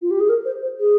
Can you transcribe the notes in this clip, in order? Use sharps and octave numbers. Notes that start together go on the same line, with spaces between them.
F4
G4
G#4
A#4
C5
C5
G#4